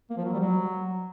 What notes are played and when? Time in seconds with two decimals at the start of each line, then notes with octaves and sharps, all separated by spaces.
0.10 A#3
0.18 F3
0.25 F#3
0.33 G3
0.40 F#3